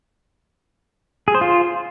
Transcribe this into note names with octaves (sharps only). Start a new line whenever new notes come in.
G#4
C5
F4